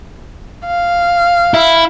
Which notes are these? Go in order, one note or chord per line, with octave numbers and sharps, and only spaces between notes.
F5
E4